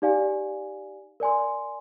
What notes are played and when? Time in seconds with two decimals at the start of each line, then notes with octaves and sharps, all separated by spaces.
0.02 D#4 G4 D5 F5 G#5
1.20 A#4 D5 G#5 C6